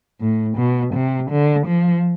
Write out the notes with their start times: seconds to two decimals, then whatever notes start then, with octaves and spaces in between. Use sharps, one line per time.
0.21 A2
0.57 B2
0.94 C3
1.31 D3
1.67 F3